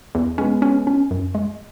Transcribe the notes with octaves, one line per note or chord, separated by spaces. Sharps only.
E2
G#3 B3 C#4
C#4
C#4
F#2
G#3